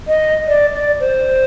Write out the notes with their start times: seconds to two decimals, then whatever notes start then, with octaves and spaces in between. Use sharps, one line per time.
0.08 D#5
0.47 D5
0.73 D5
1.00 C5